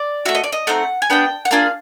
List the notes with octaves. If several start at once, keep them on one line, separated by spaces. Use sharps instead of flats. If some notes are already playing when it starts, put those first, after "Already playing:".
Already playing: D5
A3 C#4 F#4 E5
D#5
D5
D#5
A3 C4 D#4 F#5
G#5
B3 D4 G4 G5
F#5
A#3 D4 F4 G#4 F5